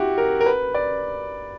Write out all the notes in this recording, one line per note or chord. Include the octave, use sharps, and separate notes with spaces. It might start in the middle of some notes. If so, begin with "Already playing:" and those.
Already playing: E4 F#4 G4
A#4
A#4
B4
D5